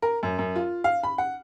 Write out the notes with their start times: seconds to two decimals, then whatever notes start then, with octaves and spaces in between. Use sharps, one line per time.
0.02 A#4
0.23 F#2
0.39 F#2
0.56 F4
0.84 F5
1.03 B5
1.18 F#5